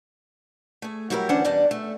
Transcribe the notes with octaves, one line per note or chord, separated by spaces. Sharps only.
A3 G#4
F#3 G3 E4 G4 A4 A#4
D2 E3 C#4 D4 C5 F#5
E2 G3 D4 D5 D#5
A3